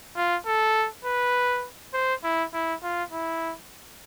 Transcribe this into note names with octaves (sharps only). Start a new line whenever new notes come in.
F4
A4
B4
C5
E4
E4
F4
E4